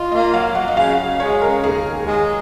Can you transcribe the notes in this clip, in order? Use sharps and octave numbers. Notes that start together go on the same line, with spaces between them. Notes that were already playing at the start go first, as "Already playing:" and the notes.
Already playing: F4 D#5
A#3 D#5
F#3 F5
F#3 F#5
D#5
C#3 F5
C#3
G#3 C#5
C#3 A#4
D#2 G#4
D#2
G#3